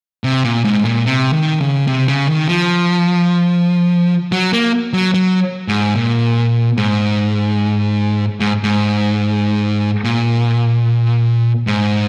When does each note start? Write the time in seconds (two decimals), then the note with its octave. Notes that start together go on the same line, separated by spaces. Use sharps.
0.24 C3
0.44 A#2
0.65 G#2
0.85 A#2
1.06 C3
1.33 D#3
1.61 C#3
1.87 C3
2.08 C#3
2.28 D#3
2.48 F3
4.32 F#3
4.53 A#3
4.93 F#3
5.14 F#3
5.68 G#2
5.95 A#2
6.77 G#2
8.40 G#2
8.64 G#2
10.04 A#2
11.67 G#2